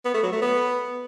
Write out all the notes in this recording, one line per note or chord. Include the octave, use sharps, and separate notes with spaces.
B3
A3
F#3
A3
B3